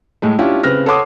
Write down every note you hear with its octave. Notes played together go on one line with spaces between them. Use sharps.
A2 G#3 A3
C#4 D4 E4 F4 G4
C#3 C4 B4 F6 A#6
A4 C#5 F#5 C6 D6 D#6